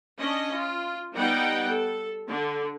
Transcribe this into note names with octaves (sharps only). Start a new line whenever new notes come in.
C#4 D4 D#5
F4
G3 B3 D#4 F#5 G5
A4
D3